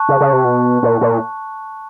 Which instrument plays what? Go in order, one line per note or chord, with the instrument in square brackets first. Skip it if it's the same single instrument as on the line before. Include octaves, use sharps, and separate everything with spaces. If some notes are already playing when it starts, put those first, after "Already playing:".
Already playing: [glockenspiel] A5 C#6 F#6
[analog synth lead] C#3
C#3
C3
B2
A#2
A#2